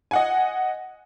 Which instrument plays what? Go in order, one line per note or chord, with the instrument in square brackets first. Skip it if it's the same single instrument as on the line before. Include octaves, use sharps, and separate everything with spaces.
[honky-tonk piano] D#5 F#5 G#5